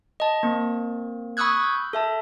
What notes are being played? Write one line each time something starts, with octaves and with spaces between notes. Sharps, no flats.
D#5 A5
A#3 C4
B5 C#6 D#6 E6 F#6 G#6
G6
A4 E5 A5